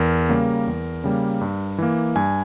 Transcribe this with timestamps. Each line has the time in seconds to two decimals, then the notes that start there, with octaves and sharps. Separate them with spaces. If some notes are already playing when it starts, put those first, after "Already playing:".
Already playing: E2 A#4
0.29 C#3 G3 A#3
0.67 E2
1.04 C#3 G3 A#3
1.41 G2
1.78 E3 A#3
2.16 G2 G#5